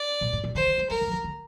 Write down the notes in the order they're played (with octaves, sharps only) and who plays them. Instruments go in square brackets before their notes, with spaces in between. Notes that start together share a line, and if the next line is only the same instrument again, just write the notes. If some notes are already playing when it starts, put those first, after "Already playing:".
Already playing: [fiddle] D5
[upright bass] A#2
A2
A#2
[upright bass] D3 [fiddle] C5
[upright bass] D#3
A3
[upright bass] G3 [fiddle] A#4
[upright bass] D3
F3
D#3
D3